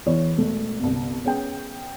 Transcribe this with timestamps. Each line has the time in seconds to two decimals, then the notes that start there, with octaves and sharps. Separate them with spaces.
0.06 E2 E3 C#5
0.36 E1 A3
0.80 G1 C2
1.25 B3 C#4 G#4 G5